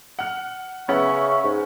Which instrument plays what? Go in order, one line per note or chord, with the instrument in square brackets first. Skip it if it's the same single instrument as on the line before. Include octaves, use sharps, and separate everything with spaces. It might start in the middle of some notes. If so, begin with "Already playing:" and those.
[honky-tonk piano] F#5 F6
[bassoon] C#3 [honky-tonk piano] B3 C#4 F#5 [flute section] E5 C#6 E6
[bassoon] G#2